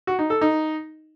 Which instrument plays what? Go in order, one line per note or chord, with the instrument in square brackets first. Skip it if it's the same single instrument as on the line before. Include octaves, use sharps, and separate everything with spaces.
[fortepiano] F#4
D#4
A4
D#4